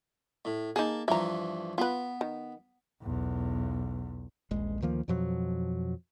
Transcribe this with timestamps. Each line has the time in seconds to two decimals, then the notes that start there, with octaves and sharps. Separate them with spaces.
0.45 A2
0.76 A#3 D#4 G#4 A5
1.08 G2 E3 F3 E5 A#5
1.78 B3 F4 B4
2.21 D#3
3.03 B1 E2
4.51 D#1 A#1 G#3
4.82 D2 D#3 F3 A#3
5.08 F2 B2 F3 F#3